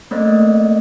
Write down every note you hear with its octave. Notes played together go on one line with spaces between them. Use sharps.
A3 A#3 C4 D5 D#5